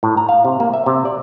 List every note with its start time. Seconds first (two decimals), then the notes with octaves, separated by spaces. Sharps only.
0.03 A2
0.17 A#5
0.29 F5
0.45 C3
0.60 A#3
0.74 E5
0.86 C3
1.05 D5